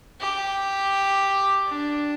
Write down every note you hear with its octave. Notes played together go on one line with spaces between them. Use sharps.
G4
D4